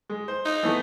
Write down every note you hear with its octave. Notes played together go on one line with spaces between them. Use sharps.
G#3
C5
D#4
E3 A3 B3